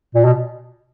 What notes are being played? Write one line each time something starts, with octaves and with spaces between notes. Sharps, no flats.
A#2
B2